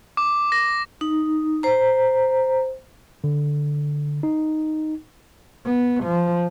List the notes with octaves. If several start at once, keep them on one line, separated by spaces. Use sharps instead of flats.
D6
A#6
D#4
C5 A#5
D3
D#4
B3
F3